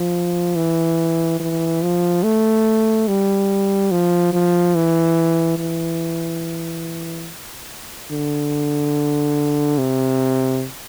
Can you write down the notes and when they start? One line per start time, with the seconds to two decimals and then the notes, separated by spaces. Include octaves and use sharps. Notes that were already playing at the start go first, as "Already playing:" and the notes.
Already playing: F3
0.56 E3
1.40 E3
1.82 F3
2.23 A3
3.08 G3
3.91 F3
4.33 F3
4.75 E3
5.58 E3
8.11 D3
9.78 C3